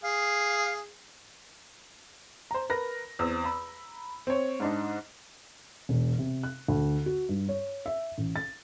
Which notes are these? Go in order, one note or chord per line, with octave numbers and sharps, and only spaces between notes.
G#4 F5
C5 A#5
A#4 B4 A#6
E2 C4 E6
A#5 B5
C4 C#5
G#2 D4 D#4
E1
C3
F#6
D2
F#4
G2
C#5
E5
A1
A6